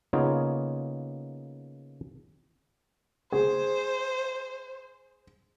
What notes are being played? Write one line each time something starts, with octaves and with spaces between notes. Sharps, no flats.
C#3 A#3 B3 D#4 F4 C#5
G#4 C5